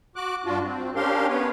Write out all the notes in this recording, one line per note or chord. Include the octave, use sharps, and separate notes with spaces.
F#4 D6 F#6
G2 D4 F4 F#4
C4
C#4 D4 G4 A#4 F5 C6
B3 B4 C#5